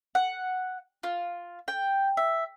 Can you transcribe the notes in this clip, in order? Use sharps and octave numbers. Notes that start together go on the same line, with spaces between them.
F#5
F4
G5
E5